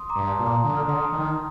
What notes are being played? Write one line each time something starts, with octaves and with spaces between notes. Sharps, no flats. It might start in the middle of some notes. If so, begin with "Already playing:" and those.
Already playing: C6 D#6
A#5 D6
G2
A5 C6
A#2
A#5 D6
D3 D#6
F6
D3 C6 D#6
D#3